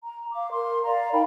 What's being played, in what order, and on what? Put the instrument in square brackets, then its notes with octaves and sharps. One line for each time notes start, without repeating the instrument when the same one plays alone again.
[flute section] A#5
F5 D6
A#4 C6
D5 F5 A#5
D#4 A#4 G5 B5